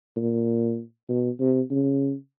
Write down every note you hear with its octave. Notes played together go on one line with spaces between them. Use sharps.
A#2
B2
C3
C#3